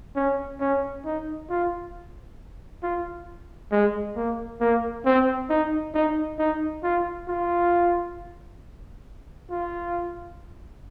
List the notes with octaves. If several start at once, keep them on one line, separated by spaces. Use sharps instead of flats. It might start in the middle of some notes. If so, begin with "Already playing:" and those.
C#4
C#4
D#4
F4
F4
G#3
A#3
A#3
C4
D#4
D#4
D#4
F4
F4
F4